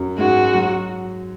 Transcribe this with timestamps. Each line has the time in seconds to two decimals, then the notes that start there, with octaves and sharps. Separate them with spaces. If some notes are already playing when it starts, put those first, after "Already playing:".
Already playing: F#2 F#3
0.18 G#2 G#3 F#4
0.55 F#3